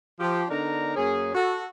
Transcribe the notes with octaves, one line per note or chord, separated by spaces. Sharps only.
F3 G4
D3 B3 D4 D#4 A#4 A#5
F#2 A#3 C#4 G#4
F#4 A4